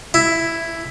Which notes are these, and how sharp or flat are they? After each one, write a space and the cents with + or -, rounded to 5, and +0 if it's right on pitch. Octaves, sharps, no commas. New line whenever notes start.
E4 +5